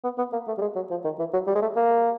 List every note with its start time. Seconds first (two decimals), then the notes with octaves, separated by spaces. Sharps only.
0.04 B3
0.18 B3
0.33 A#3
0.47 A3
0.58 G3
0.61 G#3
0.76 F#3
0.90 F3
1.04 D#3
1.19 E3
1.33 F#3
1.47 G3
1.55 G#3
1.62 A3
1.76 A#3